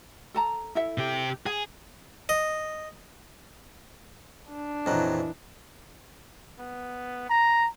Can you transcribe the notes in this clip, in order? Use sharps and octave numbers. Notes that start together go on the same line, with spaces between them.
A4 A5 A#5
E4 A4 E5
C3 G4
G#4 G#5
D#5
D4
F2 A#2 E3 F#3 D#5 A#5 F#6
B3
A#5